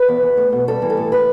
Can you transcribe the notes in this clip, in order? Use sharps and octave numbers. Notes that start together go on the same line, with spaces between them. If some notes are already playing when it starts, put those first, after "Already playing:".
Already playing: B4
E2
E2
A3
B2
G3 A4
E3
A4
A2
A2 B4